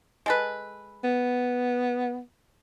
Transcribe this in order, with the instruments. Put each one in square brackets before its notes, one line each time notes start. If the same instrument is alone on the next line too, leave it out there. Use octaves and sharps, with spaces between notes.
[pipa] G#3 A4 B4
[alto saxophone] B3